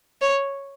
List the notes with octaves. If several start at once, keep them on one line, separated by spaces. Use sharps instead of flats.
C#5